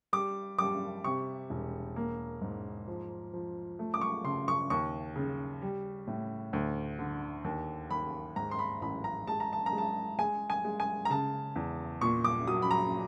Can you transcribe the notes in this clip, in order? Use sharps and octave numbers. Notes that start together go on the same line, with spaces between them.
G3 D6
G3 D6
C3 C#6
E1
A#3
G#2
F3
F3
A3
D6
C#6
C#3 C6
C#6
D#2 C#6
C#3
G3
A2
D2
D3
D#2
D#2 B5
G#2 A#5
C6
B5
A1 B5
A#5
G#3 A5
A#5
A5
A#5
G#3
A5
G#3 G#5
G#5
G#3
G#5
A#5
C#3 A5
E2
A#2 C#6
D6
F#3 D#6
B5
A#5